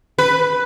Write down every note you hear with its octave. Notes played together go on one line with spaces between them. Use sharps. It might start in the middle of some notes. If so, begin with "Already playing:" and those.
B4